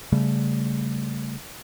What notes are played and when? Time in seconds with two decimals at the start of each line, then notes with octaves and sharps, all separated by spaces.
0.12 C#3 G3 A3